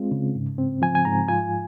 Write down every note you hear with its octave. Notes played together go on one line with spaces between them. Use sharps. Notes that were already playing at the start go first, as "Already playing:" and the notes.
Already playing: G#3 C4 F4
C#3
G#2
C4
F3 G#5
G#5
G#2 A#5
F4 G#5